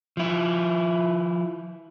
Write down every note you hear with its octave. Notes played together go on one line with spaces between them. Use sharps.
F3 E4